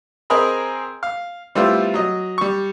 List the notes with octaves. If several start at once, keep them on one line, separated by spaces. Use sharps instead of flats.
C4 G#4 A#4 D#5 B5
F5
G3 A3 B3 C4 E4 F4
F#3 D#5
G3 C#6